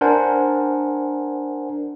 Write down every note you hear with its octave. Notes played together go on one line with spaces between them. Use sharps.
D4 A#4 C5 F#5 G#5